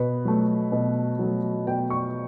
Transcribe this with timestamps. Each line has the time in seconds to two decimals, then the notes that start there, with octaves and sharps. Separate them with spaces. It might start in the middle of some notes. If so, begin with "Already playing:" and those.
Already playing: B2 B4
0.25 F#3 A3
0.72 B2
1.19 F#3 A3
1.67 B2 G5
1.90 C#6